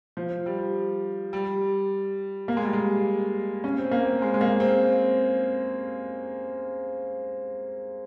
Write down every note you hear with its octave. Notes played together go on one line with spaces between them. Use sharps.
F3
G3
G3
A#3
G#3
G3
G#3
C#4
C4
A#3
C4
G#3
G#3
A#3
C4